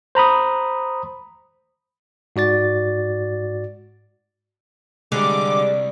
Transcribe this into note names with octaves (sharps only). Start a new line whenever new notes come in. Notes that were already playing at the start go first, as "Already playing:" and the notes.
C5 A#5 B5 D#6
G#2 F#4 D5 A6
C2 D3 G3 G#3 D6